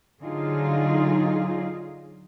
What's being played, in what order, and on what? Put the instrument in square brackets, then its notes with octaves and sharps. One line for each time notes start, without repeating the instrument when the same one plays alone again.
[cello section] D3 F#3 D#4 F4 G#4